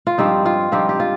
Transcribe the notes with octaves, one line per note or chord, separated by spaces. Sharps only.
F4
G2 F3 C4 D#4 G4
F4
G2 F3 C4 D#4 G4
G4
F4